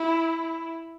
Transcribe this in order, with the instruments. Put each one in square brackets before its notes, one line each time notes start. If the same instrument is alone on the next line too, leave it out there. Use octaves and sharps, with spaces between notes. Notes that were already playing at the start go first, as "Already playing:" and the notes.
Already playing: [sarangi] E4